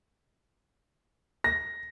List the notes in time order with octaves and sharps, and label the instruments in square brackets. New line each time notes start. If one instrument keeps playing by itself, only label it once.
[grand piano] A#6